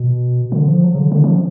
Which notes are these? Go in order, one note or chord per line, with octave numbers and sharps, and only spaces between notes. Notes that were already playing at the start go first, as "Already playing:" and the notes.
Already playing: B2
D3
F3
F#3
C#3
D3
D3
F3